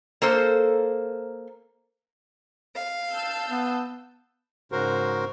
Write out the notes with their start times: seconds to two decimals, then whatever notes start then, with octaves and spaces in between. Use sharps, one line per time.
0.22 A#3 A4 C5
2.74 F5
3.10 A5 E6 G6
3.49 B3
4.72 G#2 C#3 F#4 A#4 C5